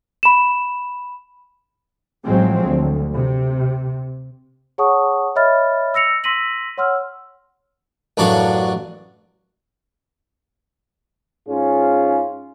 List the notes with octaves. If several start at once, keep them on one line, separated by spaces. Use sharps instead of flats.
B5 E7
A1 F3 F#3 G#3 C4
D2
C3
G#4 C#5 F#5 A5 C#6 D#6
C#5 D#5 E5 B5 F6 A6
E6 A#6 C#7 F7
C6 E6 A#6 B6 D#7 F#7
C#5 F#5 C6 E6 F6
A1 F#2 D4 F#4 F5 F#5
G#2 C#4 F4 G#4